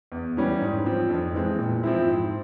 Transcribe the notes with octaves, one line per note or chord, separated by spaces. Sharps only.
E2
E3 G3 C#4
G#2
F3 C4
F2
E3 G#3 C4
A#2
F3 C4 E4
G#2